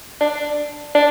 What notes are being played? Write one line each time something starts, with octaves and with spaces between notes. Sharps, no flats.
D4
D4